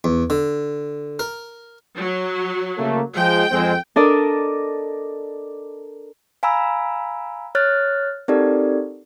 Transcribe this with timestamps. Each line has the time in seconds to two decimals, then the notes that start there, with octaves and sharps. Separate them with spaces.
0.04 E2
0.30 D3
1.19 A#4
1.98 F#3
2.78 C#3 A3 A#3
3.16 F3 G#3 G5
3.50 F2 G#3 C4
3.96 D4 A4 A#4 D5 D#5
6.43 F5 G#5 A#5 B5 E6
7.55 C#5 F6 F#6 A6
8.28 C4 D#4 G4 A4 A#4 D5